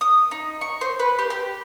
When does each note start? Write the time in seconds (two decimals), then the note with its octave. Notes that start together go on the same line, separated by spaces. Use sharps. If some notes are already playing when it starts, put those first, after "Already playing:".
0.01 D#6
0.31 D#4
0.61 C#6
0.81 C5
0.99 B4
1.19 G4
1.30 G4